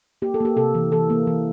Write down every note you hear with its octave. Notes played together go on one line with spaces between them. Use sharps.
A#3 G4
A4
A#3 G4
C3 A4
E3
E3 A4
A#3
E3